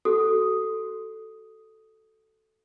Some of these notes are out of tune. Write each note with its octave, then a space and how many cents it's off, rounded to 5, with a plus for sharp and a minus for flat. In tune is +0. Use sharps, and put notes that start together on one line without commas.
F#4 +25 A4 +0 D#6 +0